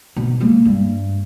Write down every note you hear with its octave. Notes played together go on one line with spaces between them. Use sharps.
B2
G#3 A#3
G2